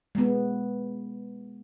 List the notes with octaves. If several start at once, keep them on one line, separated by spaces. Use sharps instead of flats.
G#3 B3